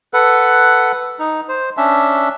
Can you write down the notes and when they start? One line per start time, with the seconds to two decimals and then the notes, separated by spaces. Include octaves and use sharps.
0.14 A4 B4 F#5
1.20 D#4
1.49 C5
1.77 C#4 D4 E5